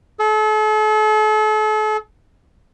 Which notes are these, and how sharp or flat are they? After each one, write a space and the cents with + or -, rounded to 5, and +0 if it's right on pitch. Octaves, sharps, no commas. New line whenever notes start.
A4 -40